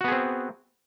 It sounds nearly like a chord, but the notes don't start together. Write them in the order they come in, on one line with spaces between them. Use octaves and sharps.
F#4 B3 G#4 C4